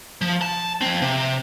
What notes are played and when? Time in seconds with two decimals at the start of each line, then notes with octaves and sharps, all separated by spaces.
0.22 F3
0.42 A5
0.81 F3 C4
1.02 C3